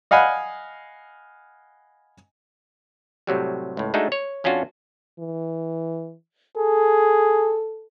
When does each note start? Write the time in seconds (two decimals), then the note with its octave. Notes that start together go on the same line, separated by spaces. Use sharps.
0.11 D#5 F5 F#5 G#5 B5
3.27 A2 C3 F#3 G3
3.77 C#2 A2
3.94 G#3 A3 D4 D#4 F#4 A4
4.12 C#5
4.44 F2 C#4 D4 F4 F#4
5.20 E3
6.57 G#4 A4